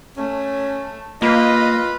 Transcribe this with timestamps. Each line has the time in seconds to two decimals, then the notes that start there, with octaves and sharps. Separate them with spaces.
0.17 A3 C#4
1.22 A#3 F4 B4 D#5